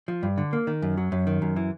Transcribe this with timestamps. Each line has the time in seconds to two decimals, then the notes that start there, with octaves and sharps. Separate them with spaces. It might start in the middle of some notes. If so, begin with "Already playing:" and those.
0.08 F3
0.23 G2
0.38 D3
0.53 A#3
0.67 D#3
0.82 F#2
0.97 F#3
1.12 F#2
1.27 D#3
1.42 F#2
1.56 E3